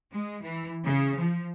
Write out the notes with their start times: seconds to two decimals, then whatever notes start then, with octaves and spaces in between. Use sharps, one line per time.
0.13 G#3
0.43 E3
0.85 C#3
1.18 F3